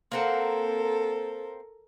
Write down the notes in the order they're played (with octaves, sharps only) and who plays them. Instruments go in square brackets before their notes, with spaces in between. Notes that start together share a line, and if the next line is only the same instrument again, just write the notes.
[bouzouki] A#3 C4 F#5 [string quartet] A4 A#4